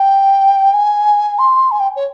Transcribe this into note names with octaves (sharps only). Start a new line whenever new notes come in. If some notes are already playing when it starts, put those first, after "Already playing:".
Already playing: G5
G#5
C6
G#5
G5
C#5